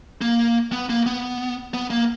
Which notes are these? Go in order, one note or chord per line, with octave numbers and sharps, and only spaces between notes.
A#3
B3
A#3
B3
B3
A#3